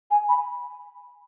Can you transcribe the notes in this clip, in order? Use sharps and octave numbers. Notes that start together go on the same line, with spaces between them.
G#5
B5